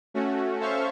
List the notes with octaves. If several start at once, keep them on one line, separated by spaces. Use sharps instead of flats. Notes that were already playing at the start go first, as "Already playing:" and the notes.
A3 C#4 F#4
C#4 A4 C5 E5 F5 C#6